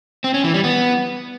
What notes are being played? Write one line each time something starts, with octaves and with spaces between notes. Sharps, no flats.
C4
C#4
E3
G3
B3